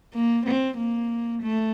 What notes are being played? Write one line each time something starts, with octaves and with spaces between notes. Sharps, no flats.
A#3
C4
A#3
A3